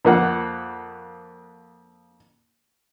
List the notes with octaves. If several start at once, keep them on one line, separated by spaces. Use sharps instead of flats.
F2 A#3 F#5